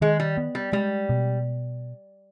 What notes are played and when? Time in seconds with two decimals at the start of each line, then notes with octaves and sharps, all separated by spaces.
0.01 D#3 G#3
0.20 G3
0.37 B3
0.55 G3
0.73 G3 G#3
1.09 B2